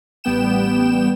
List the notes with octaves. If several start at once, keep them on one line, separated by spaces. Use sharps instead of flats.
A1 G3 B3 G5 E7